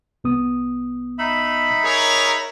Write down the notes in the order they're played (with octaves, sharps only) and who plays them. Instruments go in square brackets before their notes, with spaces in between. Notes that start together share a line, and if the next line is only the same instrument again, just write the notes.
[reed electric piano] C2 B3 D#6
[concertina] D#4 E5 B5
[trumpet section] G#4 A#4 C#5